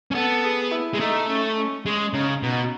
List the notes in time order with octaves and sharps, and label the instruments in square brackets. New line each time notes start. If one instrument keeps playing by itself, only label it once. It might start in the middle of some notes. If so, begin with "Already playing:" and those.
[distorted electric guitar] C#4
[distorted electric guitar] B3 [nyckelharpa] A4
[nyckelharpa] G#4
E4
[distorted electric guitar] G#3
[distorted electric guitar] A3 [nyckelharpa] D#4
[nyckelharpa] C#4
C#4
[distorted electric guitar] G#3 [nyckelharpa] C#4
[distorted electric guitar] C#3 [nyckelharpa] D#4
[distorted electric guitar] B2 [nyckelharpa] D#4